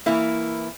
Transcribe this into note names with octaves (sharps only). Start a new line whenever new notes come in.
E3 A#3 E4